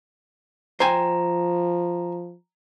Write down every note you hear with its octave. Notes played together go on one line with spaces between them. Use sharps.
F3 C5 G5 G#5 A#5